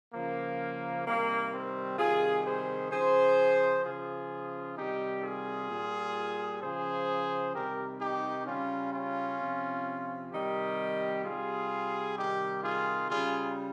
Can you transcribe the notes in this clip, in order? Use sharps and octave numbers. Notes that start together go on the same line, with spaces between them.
C#3 F3 A#3
C3 D#3 G3 A#3
C4
C3 D#3 G3 F4 G#4
G#4 C5
C#3 F3 G#4 C5
C#3 F3 F4 G#4
C3 D#3 G3 D#4 G4
F4 G#4
A#2 G3
C#3 F3 G#4 C5
C3 D#3 G3 G4 A#4
D#4 G4
C#3 G3 C#4 F4
C#4 F4
C3 F3
C3 D#3 G3 D#4 G4
C3 G3 F4 G#4
C3 D#3 G3 D#4 G4
F4 G#4
C#3 G3 F4 G#4